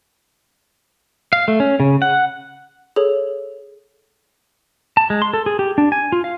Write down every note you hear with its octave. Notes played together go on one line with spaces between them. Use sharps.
F5
A3
C#4
C#3
F#5
G#4 A4 C#5
A5
G#3
C6
A4
G#4
G4
D4
G#5
F4
F5